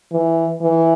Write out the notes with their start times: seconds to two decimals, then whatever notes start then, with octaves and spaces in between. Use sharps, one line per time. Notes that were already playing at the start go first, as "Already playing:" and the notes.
0.12 E3
0.61 E3